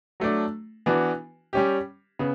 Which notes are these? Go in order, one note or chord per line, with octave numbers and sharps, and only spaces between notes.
F#3 A3 D4
E3 B3 D4 F#4
G3 C#4 G4
C#3 B3